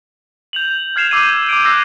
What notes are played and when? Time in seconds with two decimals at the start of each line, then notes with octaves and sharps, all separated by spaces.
0.53 G6 F7 F#7
0.96 F6 G#6 C7 E7 F7
1.11 D6 E6 F6 G6 D#7 E7
1.49 D6 G6 D7
1.64 D6 E6 F#6 A#6 C7 D#7